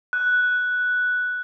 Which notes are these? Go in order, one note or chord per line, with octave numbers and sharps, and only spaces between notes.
F#6